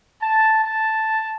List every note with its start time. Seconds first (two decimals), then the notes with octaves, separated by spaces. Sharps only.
0.22 A5
0.65 A5